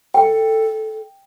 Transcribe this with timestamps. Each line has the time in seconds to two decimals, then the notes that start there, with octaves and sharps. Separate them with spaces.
0.14 A4 G5